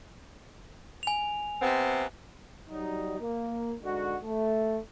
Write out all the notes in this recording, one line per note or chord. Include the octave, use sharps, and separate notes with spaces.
G#5 F7
C3 B3 C4
F#3 G3 D#4
A#3
G#2 D3 F#4
A3